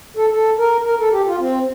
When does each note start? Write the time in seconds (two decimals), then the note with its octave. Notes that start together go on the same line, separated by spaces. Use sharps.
0.17 A4
0.31 A4
0.58 A#4
0.85 A#4
0.99 A4
1.12 G4
1.27 F4
1.40 C4